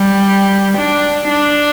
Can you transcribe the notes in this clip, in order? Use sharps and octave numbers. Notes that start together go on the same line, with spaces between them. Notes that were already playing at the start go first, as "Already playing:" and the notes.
Already playing: G3
D4
D4